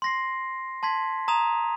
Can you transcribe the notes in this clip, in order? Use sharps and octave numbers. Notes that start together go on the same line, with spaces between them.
C6 A#6 C7
A5 C6 G#6 B6
A#5 D#6 G#6 D#7 F7